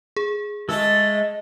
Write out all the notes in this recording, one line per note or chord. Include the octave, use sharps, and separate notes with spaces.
G#4
G#3 A3 A4 D#5